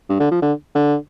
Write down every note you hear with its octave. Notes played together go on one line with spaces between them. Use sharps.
G2
D3
F3
D3
D3